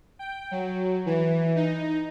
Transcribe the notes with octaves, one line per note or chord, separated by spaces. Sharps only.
G5
F#3
E3
D#4